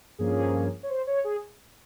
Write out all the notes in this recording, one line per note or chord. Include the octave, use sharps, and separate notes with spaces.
G2 F3 A#3 C#4 G#4
C#5
C5
C#5
G#4